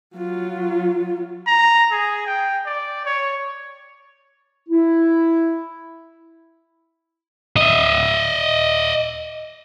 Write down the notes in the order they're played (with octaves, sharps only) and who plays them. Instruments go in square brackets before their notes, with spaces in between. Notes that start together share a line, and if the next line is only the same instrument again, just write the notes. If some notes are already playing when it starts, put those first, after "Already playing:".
[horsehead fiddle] F#3 F4
[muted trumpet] A#5
G#4
G5
D5
C#5
[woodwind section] E4
[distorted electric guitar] D#5 E5